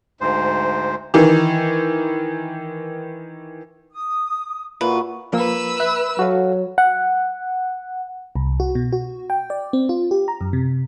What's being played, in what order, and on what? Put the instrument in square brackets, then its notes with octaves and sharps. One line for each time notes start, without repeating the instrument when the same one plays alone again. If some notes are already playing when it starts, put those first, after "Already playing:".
[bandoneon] D2 G#2 C5
[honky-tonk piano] D#3 E3
[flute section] D#6
[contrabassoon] A#2 [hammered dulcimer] E4 F#4 G#4 [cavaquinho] B4
[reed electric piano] F3 A#3 [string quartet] B4 E6
[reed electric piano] E5 F#6
[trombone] F#3 [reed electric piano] F#4 A4 F5
[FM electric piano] F#5
C2
F#4
B2
F#4
G5
D5
C4
F4
G4
A#5
F#2
C3